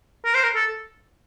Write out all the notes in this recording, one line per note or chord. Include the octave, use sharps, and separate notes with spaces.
A#4
C5
A#4
A4